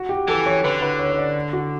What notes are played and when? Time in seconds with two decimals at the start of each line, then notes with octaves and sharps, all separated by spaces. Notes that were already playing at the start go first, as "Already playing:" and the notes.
Already playing: F#4
0.09 G4
0.28 E3 A4
0.46 C#5
0.64 D3 B4
0.82 B4
0.99 C#5
1.10 C#5
1.18 D5
1.53 F#4